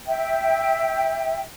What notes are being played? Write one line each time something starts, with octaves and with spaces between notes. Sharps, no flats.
E5 G5